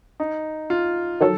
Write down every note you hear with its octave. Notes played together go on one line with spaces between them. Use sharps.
D#4
F4
D#3 F#3 A4